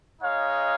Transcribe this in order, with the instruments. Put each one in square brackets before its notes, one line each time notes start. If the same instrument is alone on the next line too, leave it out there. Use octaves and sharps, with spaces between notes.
[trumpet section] G#3 D#4 C#5 F5